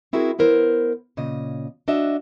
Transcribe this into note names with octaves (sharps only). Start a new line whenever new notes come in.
C4 E4 F#4 G#4 A#4
B3 E4 A#4 C5
A#2 C#3 D#5
D4 F#4 D#5 E5